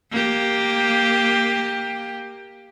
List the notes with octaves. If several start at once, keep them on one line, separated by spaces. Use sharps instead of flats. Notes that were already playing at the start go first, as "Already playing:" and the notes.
A#3 G4